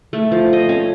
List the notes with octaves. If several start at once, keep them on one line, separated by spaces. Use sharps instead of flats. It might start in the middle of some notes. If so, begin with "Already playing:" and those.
A3
F3
D#5
C#4